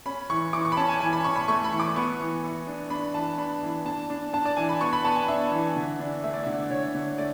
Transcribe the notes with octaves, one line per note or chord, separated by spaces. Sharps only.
C#4 B5
E3 C#6
E3 D6
C#6
B5
C#4 A5
G#5
E3 G#5
B5
C#4 C#6
B5
A3 C#6
B5
E3
D6
B3 C#6
E3
E3
D4
D4 B5
E3 A5
D4 B5
E3
D4 A5
D4
D4 A5
D5
E3 G#5
B5
B3 C#6
B5
B3 A5
G#5
D4 E5
E3
D3
D4
A3 E5
D5
D3 E5
D3 C#5
D3
A3 D5